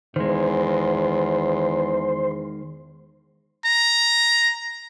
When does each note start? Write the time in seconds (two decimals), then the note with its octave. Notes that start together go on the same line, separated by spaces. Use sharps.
0.16 E2 D#3 G#3 C5
3.65 A#5